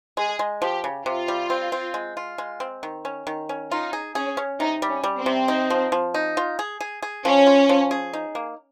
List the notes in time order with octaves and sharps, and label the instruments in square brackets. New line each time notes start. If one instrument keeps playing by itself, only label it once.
[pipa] G#3 [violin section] G#4
[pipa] G#3
[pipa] F3 [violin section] G4
[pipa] C#3
[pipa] C3 [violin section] F4
[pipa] G3
C4
C4
G#3
F4
G#3
C4
D#3
C#4
D#3
C#4
[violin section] D#4 [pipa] F4
[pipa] G#4
[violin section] C#4 [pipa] G#4
[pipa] C#4
[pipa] C3 [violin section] D#4
[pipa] G3
[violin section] C#4
[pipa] G3
[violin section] C4
[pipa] C3
D#4
F3
F3
D#4
F4
G#4
G#4
G#4
[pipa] F3 [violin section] C#4
[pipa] F4
F3
G#4
D#4
A#3